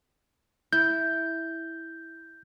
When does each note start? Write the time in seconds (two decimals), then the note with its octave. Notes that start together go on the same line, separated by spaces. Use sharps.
0.73 E4 G6